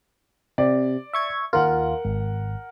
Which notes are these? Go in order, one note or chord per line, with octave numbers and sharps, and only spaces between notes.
C3 D5
E5 C#6 G#6
D#2 F4 A#4 F#5
G#1